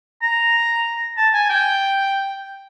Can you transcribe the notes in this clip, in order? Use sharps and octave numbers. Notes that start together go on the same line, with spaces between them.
A#5
A5
G#5
G5